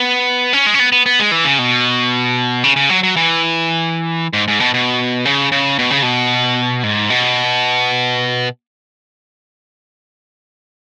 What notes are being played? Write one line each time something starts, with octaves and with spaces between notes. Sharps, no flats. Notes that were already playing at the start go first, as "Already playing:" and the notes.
Already playing: B3
C#4
G#3
C#4
B3
B3
B3
G#3
E3
C#3
B2
C#3
C#3
F#3
F#3
E3
G#2
G#2
B2
B2
C#3
C#3
B2
C#3
B2
G#2
B2